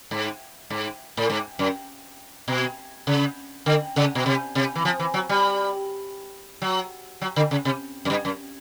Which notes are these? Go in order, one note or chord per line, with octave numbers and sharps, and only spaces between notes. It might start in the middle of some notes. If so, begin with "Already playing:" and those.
G#2
G#2
A2
G#2
F#2
B2
C#3
D3
C#3
B2
C3
C3
E3
F3
E3
F#3
G3
F#3
F#3
D3
C#3
C3
F#2
G2
F#2